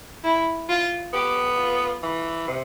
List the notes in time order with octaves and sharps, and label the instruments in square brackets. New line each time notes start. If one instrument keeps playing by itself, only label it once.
[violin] E4
F4
[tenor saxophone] B3 [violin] G4
[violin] F4
[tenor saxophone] E3
C3